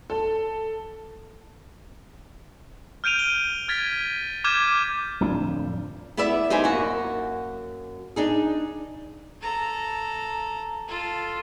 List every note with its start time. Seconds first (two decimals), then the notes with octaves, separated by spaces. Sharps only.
0.10 A4
3.04 F6 G6 D7 D#7 F7
3.19 G7
3.68 F6 G#6 A6 B6
4.44 D6 F6 G6 G#6 D#7 E7
5.20 D1 F2 F3 D4
6.17 B3 E4 B4 D5 E5
6.50 D#4 G4 B4 C5 G#5
6.64 F#2 A#3 F#4
8.16 D4 D#4 G#4
9.42 A4 A#5
10.88 F4 A4